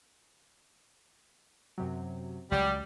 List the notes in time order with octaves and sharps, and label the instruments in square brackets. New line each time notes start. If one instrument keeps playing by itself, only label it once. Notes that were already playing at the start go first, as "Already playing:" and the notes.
[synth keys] F#2 C3 F#3
[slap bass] C#2 [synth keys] F#3 [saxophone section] G3